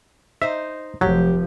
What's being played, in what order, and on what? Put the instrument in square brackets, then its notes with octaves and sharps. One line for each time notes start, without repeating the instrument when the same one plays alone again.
[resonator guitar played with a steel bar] D#4 C5 [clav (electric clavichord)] E5
[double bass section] F1 F3 [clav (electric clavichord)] F#3 [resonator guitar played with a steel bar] G4